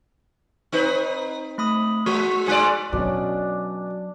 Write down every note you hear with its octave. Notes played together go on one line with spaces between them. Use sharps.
C4 D#4 B4
A3 B5 D#6
G#3 F#4
G#2 G#3 G#4 D5 G#5 F#6
B2 F#3 C#4 D4